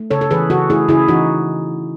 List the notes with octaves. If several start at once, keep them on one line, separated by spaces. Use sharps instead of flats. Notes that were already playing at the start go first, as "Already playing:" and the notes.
Already playing: A3
C#3 A4 C#5
A4
E3 G#4 B4
C#3 F#4 A4
A3 E4 G#4
C#3 E4 G#4
E3 D#4 F#4